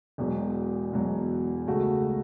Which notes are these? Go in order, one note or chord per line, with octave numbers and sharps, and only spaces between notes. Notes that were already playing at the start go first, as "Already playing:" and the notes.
E1 E2 B2 F#3
E1 E2 B2 F#3
C#2 C#3 A3 F#4